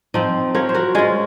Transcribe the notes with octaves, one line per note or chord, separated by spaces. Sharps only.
F3 C4 D#4
F3 A#4 C#5
C5
F#4 A#4
G#3 C#4 F4 G#4